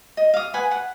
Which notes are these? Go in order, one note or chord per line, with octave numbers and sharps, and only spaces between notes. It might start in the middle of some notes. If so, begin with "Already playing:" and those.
D#5
F5 D#6
B4 F#5 G#5
F#5